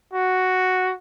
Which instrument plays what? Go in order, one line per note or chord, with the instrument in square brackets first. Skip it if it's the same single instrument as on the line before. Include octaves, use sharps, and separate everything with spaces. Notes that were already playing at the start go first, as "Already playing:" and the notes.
[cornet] F#4